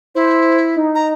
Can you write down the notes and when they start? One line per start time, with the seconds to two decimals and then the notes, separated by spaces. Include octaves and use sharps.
0.15 E4 C5
0.76 D#4
0.95 A#5